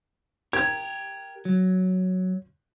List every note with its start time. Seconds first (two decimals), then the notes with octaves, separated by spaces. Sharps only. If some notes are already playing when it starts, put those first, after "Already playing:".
0.53 G4 A#4 G#6
1.45 F#3